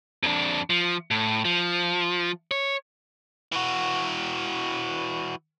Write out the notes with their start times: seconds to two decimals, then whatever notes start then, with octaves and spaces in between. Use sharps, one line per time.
0.23 F2 D4
0.70 F3
1.11 A2
1.45 F3
2.51 C#5
3.52 E3 F#4